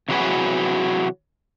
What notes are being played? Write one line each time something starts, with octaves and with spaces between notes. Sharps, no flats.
C3 E3 F#3 F#4 G#4 B4